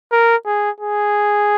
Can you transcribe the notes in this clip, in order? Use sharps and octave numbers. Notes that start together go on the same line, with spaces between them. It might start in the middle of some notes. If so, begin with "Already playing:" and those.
A#4
G#4
G#4